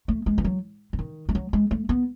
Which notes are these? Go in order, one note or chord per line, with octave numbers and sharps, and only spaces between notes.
A3
G#3
E3
F#3
E3
D#3
G#3
F#3
G#3
A3
B3